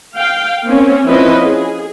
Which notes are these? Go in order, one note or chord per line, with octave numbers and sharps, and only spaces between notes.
F5 G5
A#3 C4 C#4
F3 C4 C#4 E4 B4 D#5
G#4